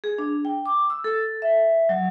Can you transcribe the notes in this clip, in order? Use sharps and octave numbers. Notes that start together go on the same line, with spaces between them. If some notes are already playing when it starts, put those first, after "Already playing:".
G#4
D4
G5
D6
E6
A4
E5
F#3